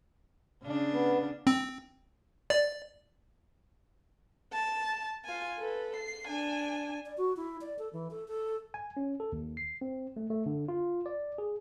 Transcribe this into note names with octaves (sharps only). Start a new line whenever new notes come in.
C#3 D4
B3
C4
D5
A5
F4 G#5
A4 B4
C7
D4 G#5
D5
F#4
E4
D5
A4
E3
A4
A4
G#5
C#4
A4
D#2
C7
C4
A3
A3
D3
F4
D5
G#4